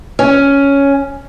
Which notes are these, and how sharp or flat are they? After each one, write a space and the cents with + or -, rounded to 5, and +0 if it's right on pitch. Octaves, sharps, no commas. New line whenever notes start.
C#4 +5